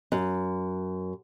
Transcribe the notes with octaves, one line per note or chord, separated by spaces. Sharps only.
F#2